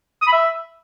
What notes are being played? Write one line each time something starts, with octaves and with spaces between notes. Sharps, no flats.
D#6
B5
E5